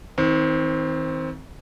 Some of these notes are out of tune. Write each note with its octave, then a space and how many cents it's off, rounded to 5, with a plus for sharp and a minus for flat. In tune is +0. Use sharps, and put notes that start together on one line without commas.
D#3 +40 C4 +0